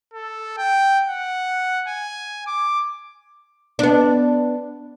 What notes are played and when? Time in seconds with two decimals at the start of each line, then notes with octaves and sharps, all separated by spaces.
0.13 A4
0.58 G5
1.08 F#5
1.88 G#5
2.47 D6
3.79 B3 D4